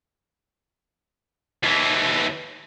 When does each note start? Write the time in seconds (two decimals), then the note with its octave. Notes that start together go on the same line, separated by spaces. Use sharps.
1.63 D#2 E3